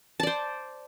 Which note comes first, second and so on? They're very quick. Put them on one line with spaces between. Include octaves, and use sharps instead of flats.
A5 D5 C5